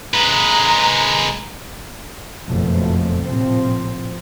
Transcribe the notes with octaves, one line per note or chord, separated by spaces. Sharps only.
G#3 B4 A#5
F#1 F2 B2 F3 F#3 A3
A#1 A2 C3 F3 C4